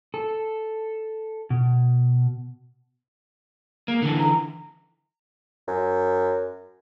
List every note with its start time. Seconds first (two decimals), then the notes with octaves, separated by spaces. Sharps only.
0.14 A4
1.50 B2
3.88 A#3 G#4
4.02 D3 E3 A4
4.18 A#5
5.68 F#2